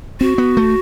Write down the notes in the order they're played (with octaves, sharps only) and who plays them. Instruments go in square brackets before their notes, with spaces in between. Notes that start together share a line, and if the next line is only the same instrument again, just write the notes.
[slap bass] C4 [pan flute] F#4
[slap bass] B3
A3